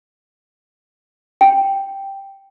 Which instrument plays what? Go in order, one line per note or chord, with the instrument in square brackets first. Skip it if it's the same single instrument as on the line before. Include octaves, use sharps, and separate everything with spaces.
[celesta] G5